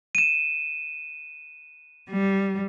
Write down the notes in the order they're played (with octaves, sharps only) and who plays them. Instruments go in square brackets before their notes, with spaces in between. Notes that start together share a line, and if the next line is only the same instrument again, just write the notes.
[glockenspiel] D#7 E7
[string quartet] G3